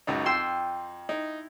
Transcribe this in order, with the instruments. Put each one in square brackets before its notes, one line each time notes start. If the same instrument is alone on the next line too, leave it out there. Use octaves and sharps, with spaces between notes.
[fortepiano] C#2 F#2 D#4
[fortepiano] F2 [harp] G5 C6 E6
[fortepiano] D#4 [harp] E4